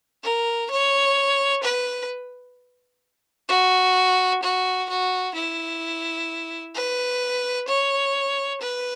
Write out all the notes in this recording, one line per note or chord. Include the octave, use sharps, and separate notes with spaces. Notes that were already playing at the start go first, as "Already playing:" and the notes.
A#4
C#5
B4
F#4
F#4
F#4
E4
B4
C#5
B4